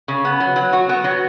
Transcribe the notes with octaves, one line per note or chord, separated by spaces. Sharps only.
C#3
B3
F#3
F#3
F#4
B3
F#3